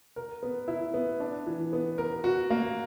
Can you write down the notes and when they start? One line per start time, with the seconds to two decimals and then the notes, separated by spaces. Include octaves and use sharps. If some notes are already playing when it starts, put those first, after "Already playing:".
0.16 A#4
0.43 B3
0.68 E4
0.94 B3
1.20 D4
1.47 E3
1.73 B3
1.98 A#4
2.24 F#4
2.50 A#3